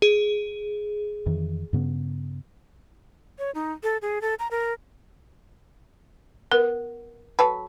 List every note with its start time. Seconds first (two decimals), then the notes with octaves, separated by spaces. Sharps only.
0.02 G#4
1.26 F2 D#3 E3
1.73 G2 C#3 B3
3.39 C#5
3.55 D#4
3.83 A4
4.02 G#4
4.21 A4
4.39 A#5
4.51 A#4
6.52 B3 A#4
7.39 F#3 A4 B4